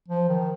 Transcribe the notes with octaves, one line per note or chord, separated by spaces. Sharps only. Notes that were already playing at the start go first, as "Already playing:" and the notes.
F3
D#3